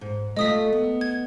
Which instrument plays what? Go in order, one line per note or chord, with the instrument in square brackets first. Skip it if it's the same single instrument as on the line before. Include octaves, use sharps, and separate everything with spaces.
[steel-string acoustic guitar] G#2
[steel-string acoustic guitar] A3 F4 [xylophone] D#5 D#6 B6
[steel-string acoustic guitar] B3
[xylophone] G#6